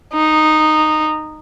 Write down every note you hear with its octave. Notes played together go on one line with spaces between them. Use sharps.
D#4